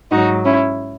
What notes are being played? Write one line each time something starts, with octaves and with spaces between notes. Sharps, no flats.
G#2 F#3 D#4 F#4
C#4 E4